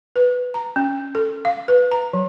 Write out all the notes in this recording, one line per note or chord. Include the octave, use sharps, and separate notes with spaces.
B4
A#5
C#4
A4
F5
B4
A#5
F#3